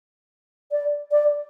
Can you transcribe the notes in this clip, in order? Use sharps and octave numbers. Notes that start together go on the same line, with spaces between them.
D5
D5